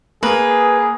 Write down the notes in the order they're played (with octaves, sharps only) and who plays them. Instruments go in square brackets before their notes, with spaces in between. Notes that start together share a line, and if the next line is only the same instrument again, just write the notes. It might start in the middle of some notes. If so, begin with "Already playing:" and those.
[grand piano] A#3 [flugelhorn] G#4 [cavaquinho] B4